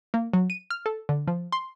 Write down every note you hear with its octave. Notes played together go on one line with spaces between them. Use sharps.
A#3
F#3
D#7
F6
A4
D3
F3
C6